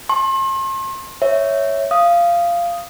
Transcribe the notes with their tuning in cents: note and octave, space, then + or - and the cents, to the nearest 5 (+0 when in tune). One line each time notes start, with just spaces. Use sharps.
A5 +0 C6 +40
C#5 +0 E5 -5
F5 -15 D#6 +0